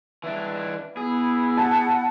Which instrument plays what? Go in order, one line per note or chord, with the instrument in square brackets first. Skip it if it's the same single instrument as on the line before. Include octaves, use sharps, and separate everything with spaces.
[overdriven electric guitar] E3 D4
[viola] B3 E4 [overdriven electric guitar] G#4
[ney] F#5 [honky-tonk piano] A5